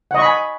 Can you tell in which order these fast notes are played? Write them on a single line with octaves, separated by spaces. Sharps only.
F#5 D#5 C#6 B5 G#5